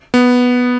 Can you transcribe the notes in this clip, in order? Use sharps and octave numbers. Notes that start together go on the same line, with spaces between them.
B3